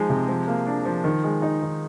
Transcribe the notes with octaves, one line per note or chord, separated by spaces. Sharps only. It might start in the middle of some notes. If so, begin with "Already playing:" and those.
Already playing: F3 G#3 D#4
C3
F3
A#3
D4
F3
D#3
G#3
D#4
D#3